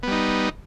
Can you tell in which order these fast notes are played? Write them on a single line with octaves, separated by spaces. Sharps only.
B3 G3 D#4